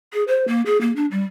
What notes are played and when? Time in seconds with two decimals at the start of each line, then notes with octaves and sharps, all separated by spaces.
0.13 G#4
0.28 C5
0.48 A#3
0.66 G#4
0.81 A#3
0.96 D4
1.11 G3